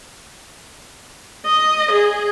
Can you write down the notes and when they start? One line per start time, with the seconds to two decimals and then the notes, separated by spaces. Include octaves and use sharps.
1.46 D#5
1.91 G#4